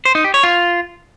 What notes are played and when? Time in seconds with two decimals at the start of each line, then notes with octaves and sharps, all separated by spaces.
0.05 C5
0.15 D#4
0.24 G4
0.34 C#5
0.43 F4